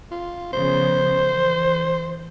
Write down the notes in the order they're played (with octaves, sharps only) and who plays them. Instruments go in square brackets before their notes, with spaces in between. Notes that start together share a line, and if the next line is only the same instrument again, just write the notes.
[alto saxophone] F4
[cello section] C#3 F3 B3 [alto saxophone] C5
[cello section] E3